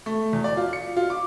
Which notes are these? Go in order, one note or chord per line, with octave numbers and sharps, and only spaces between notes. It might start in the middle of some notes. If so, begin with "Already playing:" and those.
A3
E2
D5
F4
C#7
F4
D6